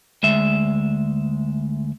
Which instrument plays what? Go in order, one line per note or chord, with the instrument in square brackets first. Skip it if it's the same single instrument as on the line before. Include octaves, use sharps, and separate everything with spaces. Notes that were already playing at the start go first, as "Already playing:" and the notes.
[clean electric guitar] D2 G#3 E5